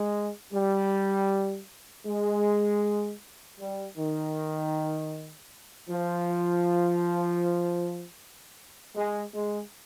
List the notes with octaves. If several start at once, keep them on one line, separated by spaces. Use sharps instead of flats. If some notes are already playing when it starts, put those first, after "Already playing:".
Already playing: G#3
G3
G#3
G3
D#3
F3
G#3
G#3